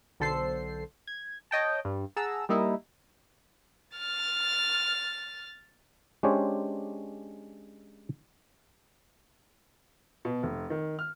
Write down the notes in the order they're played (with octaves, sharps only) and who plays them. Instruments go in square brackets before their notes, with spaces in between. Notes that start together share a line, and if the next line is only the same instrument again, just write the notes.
[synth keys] B1 D3 A4 C5 C7
G#6
C#5 D#5 G5 A5
G2
G#4 F#5 A5 A#5 E6
G3 A#3 D#4 E4
[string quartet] F6 A6
[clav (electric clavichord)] G#3 C#4 D4 G4 C5 C#5
[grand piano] B2
F1
D#3
F6